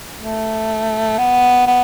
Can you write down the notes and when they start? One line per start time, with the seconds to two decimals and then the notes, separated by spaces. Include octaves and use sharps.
0.20 A3
1.18 B3
1.67 B3